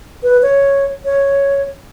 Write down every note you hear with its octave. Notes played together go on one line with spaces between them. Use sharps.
B4
C#5
C#5